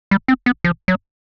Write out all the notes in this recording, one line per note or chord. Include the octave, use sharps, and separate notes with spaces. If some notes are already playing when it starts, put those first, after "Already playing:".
G3
C4
B3
F3
F#3